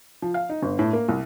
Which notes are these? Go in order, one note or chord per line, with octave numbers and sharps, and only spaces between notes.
F3
F5
D#4
G1
A2
A#3
C2